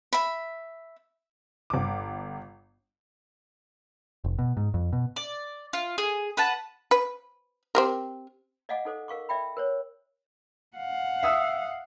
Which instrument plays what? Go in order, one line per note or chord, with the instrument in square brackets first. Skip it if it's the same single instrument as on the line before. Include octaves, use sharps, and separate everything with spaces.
[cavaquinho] E5 B5
[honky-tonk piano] G1 D6
[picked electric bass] F1
B2
G#2
F2
B2
[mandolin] D5
F4
G#4
B4 F#5 A5
[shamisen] B4
C4 G4 A#4
[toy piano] D5 D#5 F5 F#5 G#5 D6
D#4 A4 C5 D6
A#4 F5 C#6 D6
D5 E5 G5 B5
A#4 C5 C#5
[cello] F5 F#5
[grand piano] E5 D#6 E6